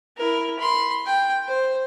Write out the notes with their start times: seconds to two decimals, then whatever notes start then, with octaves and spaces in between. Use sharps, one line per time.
0.17 E4 A#4
0.59 B5 C6
1.06 G5
1.48 C5